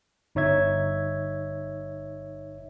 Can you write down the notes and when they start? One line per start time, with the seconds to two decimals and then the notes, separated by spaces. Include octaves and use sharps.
0.35 G1 D#4 C#5 E5 G#6